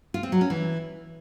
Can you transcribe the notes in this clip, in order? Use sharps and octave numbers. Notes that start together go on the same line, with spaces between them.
F4
C4
F#3
C#4
E3